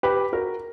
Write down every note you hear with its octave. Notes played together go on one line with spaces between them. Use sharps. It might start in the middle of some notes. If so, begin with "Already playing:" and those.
G4 B4
F#4 A#4